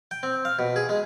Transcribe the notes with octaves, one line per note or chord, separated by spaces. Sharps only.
G5
C4
F5
B2
G#4
G#3